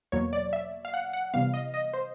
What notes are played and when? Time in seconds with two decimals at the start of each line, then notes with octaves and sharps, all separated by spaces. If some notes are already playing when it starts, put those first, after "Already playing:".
0.12 E2 B2 F#3 A#3 C#5
0.33 D5
0.53 E5
0.85 F5
0.94 F#5
1.13 F#5
1.34 C3 E3 G3 B3 F5
1.54 D#5
1.74 D#5
1.93 C5